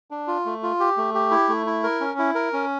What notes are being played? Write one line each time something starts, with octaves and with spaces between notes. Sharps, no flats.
D4
F4
A3
F4
G4
A3
G4
E4
A3
E4
A#4
C#4
E4
A#4
C#4